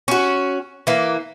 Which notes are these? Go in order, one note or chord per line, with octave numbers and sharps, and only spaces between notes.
C#4 F#4
E3 A#3